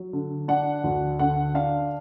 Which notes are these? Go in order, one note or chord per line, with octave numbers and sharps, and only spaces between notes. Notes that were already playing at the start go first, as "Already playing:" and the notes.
Already playing: F#3
D3
D4 F#5
D2
D3 F#5
D4 F5